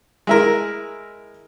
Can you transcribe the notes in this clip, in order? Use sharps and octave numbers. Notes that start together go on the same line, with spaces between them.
G#3 E4 A#4